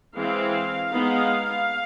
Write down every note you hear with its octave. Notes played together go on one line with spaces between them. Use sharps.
E3 G#3 C4 F5
G#3 B3 D#4